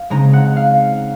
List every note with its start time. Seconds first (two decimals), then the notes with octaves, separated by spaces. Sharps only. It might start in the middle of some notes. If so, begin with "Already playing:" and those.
Already playing: F5
0.10 C#3 G#3 C4 D#4 A#5
0.33 F#5
0.56 F5